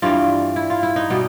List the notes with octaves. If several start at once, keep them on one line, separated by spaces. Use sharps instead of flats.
G2 E3 G3 F4
E4
F4
E4
D#4
B2 G3 B3